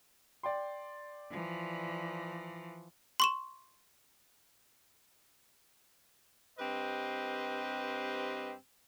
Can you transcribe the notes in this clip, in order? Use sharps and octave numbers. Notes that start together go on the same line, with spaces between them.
D5 G5 C6
E3 F3
C6 C#6 E7
G2 C4 G4 B4 C5 D#5